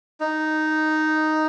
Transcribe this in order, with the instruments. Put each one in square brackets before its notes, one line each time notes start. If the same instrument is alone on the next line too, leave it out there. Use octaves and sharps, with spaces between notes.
[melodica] D#4